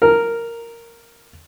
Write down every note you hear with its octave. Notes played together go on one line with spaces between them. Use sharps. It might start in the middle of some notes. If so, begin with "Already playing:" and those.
A#4